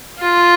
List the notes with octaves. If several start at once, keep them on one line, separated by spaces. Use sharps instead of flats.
F4